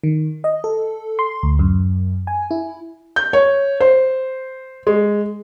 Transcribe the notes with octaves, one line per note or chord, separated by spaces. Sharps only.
D#3
D#5
A4
C6
D2
F#2
G#5
E4
G6
C#5
C5
G#3